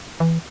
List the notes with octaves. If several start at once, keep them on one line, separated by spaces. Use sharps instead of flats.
E3